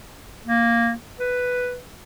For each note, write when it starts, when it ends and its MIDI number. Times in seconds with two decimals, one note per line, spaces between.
0.45 0.93 58
1.19 1.79 71